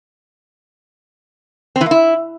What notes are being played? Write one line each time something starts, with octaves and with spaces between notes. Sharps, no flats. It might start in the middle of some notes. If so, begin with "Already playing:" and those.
C4
E3
A#3
E4